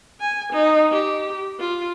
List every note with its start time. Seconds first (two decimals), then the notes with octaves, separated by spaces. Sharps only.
0.20 G#5
0.52 D#4
0.91 G4
1.60 F4